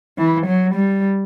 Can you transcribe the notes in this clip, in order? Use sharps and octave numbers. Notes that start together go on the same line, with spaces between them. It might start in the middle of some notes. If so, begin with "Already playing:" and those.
E3
F#3
G3